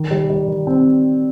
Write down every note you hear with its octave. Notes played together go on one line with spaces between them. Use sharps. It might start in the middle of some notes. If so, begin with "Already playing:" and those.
Already playing: D#3
G3
G3
D#3
C4